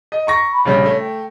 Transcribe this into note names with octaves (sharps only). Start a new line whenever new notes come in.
D#5
A#5 C#6 A#6
B5
A#1 C#3 G3 C#5
A3
G5